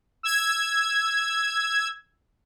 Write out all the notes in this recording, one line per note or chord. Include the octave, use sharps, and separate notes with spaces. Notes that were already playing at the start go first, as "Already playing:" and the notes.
E6 G#6